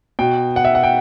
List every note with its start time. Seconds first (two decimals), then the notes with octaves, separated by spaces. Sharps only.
0.19 B2 G5
0.56 F#5
0.65 E5
0.75 F#5
0.83 G5